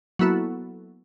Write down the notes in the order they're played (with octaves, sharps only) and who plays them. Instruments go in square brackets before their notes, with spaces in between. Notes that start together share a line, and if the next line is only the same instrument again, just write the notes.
[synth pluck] F#3 A#3 B3 E4 F#4 A4